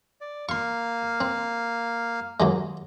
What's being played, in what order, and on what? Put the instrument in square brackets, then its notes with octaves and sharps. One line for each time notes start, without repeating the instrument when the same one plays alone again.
[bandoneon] D5
[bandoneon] A#3 F5 [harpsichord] C6 C#6
[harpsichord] C4
D#2 F#3 G#3